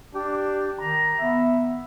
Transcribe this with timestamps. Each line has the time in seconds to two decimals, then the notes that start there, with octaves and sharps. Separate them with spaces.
0.15 D4 G4
0.80 D#3 A#5
1.19 B3 E5